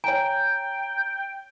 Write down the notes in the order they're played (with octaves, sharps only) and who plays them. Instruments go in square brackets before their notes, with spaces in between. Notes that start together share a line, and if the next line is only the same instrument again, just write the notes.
[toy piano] C#5 G#5 [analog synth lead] G5 [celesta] A#5